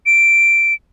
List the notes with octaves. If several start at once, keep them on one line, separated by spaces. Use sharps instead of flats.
D7